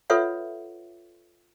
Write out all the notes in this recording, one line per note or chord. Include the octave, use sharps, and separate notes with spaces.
F4 A4 B4 C#5 E5 F#5